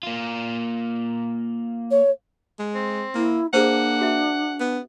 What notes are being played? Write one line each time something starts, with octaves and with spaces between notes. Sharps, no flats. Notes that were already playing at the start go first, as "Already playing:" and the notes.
A#3 F4
C#5
G#3
C4
A#3 E4
A#3 D4 G#4 C5 F#5
F#4 E5
B3